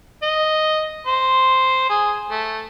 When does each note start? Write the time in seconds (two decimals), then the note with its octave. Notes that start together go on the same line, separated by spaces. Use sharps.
0.22 D#5
1.07 C5
1.89 G#4
2.31 A3